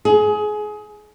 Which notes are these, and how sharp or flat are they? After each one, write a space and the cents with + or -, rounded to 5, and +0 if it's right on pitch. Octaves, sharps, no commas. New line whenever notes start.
G#4 +25